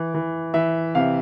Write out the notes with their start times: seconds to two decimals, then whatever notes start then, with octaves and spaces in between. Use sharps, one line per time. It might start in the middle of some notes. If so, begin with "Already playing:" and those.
Already playing: E3
0.14 E3
0.54 E3 E5
0.95 C3 F5